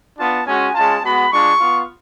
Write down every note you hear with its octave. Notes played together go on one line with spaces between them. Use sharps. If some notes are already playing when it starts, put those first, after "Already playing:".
B3 D4 F4 A5
G#3 C#4 F#4 G#5
G#3 C#4 F4 A5
G#3 B3 F#4 B5
G#3 D4 F4 C#6
B3 F4